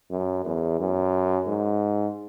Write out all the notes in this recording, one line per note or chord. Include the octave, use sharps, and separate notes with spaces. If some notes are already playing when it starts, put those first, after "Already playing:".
F#2
E2
F#2
G#2